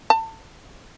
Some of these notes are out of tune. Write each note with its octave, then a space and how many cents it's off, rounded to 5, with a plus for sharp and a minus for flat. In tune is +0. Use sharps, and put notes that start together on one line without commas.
A5 +30